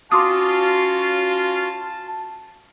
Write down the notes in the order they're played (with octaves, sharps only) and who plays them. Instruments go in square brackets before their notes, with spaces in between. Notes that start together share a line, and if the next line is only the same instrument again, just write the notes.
[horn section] C#4 F4 [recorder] F#4 [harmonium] A5 [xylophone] C6 D6 D#6